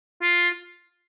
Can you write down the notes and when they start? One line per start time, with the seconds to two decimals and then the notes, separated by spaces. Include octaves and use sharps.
0.22 F4